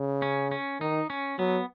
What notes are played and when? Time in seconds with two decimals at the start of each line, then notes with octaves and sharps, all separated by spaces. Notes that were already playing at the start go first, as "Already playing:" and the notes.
Already playing: C#3
0.22 C#4
0.51 C#4
0.80 D#3 D#4
1.10 C#4
1.39 F#3 B3